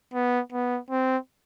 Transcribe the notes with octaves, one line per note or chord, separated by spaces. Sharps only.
B3
B3
C4